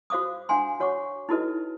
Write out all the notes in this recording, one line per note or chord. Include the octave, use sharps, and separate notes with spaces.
F#4 C5 F5 D6 D#6
D4 F5 F#5 G#5 C6
F#4 C#5 F#5 C#6 D6
D#4 E4 F#4 A4 B4 D#5